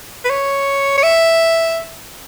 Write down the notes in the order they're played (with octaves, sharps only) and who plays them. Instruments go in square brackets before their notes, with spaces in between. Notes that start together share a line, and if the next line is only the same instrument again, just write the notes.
[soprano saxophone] B4
C#5
C#5
E5